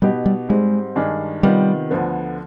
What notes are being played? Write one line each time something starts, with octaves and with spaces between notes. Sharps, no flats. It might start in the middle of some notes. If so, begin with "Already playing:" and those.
B2 G3 B3 D#4 G4
G3
G#2 G3 G#3 C4
G2 D#3 G#3 D4 G#4
C3 D#3 G3 B3 F4
D2 D3 F3 B3